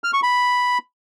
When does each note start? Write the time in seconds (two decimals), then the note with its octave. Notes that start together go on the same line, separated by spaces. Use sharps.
0.04 F6
0.13 C#6
0.23 B5